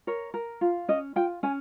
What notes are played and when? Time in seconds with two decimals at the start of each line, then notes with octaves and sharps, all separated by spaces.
0.07 A#4 C#5
0.34 A#4
0.61 F4
0.88 C#4 D#5
1.16 F4 G5
1.43 C#4 G#5